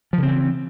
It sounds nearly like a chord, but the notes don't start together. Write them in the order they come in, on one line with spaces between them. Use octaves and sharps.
F3 C#3 C4 E3